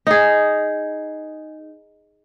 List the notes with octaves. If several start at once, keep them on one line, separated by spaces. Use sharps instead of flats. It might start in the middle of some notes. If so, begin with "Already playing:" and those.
D#4 G#4